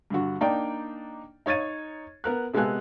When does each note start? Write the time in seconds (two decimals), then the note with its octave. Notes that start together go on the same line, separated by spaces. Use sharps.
0.10 G2 D3 F#4
0.41 A#3 D4 D#4 D5 G5
1.46 D#4 C#5 G#6 A6 D#7
2.24 B3 A#4 F#6
2.54 C3 G#3 B3 A4 G#5 F#6